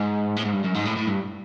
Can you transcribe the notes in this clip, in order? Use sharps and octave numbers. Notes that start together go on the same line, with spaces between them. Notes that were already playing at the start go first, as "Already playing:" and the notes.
Already playing: G#2
A2
G#2
G2
F#2
G#2
A2
A2
G2